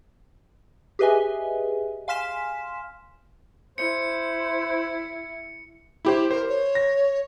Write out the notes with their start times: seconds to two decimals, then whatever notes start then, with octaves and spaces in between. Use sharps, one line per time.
0.99 G4 G#4 B4 D#5 E5 G#5
2.08 F5 G#5 C6 F6 B6 E7
3.78 E4 C5 C#7
6.05 E4 G4 C5
6.31 A#4 C5
6.49 C#5
6.75 A#6